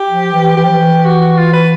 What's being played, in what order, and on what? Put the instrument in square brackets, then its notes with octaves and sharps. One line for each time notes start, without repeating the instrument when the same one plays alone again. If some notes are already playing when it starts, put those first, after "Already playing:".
Already playing: [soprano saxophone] G4
[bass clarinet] F3
E3
[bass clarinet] E3 [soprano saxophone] G4
[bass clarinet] F3
E3
[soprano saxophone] F#4
F#4
F4
B4